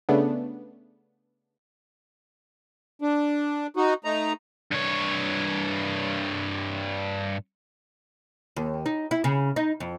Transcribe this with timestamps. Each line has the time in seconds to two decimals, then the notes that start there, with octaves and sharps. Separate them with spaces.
0.09 C#3 A3 B3 D4
3.02 D4
3.76 D#4 F#4
4.04 A3 D#4 A#5
4.71 G2 C#5
8.56 D#2
8.86 D#4
9.11 E4
9.24 C#3
9.56 D#4
9.80 F2